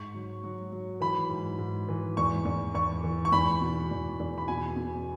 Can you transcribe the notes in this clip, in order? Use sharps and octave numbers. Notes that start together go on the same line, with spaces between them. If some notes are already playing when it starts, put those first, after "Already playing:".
Already playing: G#2 C#6
F#3
F#3
F#3
E3 B5
G#2
G#2
E3
E2 C#6
E2
E2 C#6
E3
C#6
E2 B5
B2
E2
E2
B5
B2 G#5
B2